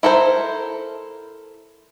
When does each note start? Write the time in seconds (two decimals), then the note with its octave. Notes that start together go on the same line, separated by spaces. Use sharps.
0.03 E4 A4 A#4 C5